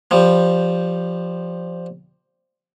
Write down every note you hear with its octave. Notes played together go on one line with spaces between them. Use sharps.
F3 G3